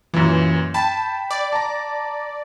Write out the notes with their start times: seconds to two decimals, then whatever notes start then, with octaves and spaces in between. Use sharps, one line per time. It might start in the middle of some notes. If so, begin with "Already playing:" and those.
0.14 F#2 A#2 E3
0.74 G5 A5 B5
1.30 D5
1.53 A5 A#5